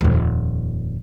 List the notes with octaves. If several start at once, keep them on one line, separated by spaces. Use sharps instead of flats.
D#1 F2